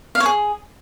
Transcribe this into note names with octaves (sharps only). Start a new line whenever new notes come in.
F5
C#5
G#4